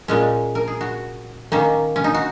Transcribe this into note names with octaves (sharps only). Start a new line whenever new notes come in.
A#2 G#3 C#4
A#4
G#4
F#4
D#3 A#3 C#4
C#4
D#4
F#4